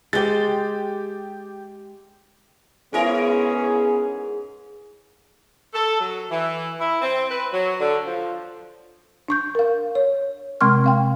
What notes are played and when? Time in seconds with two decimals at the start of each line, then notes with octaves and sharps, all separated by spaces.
0.13 G#3 G4 C5 A6
2.93 G#2 B3 C#4 E4 G#4 A#4
5.74 A4
5.99 F#3
6.30 E3
6.79 E4
7.02 C4
7.30 B4
7.52 F#3
7.79 D3
8.05 F3
9.28 D4 C#6 G6
9.55 A#4 F5
9.95 C#5
10.61 C3 G#3 C4 C6 C#6 F6
10.84 C4 F5 G5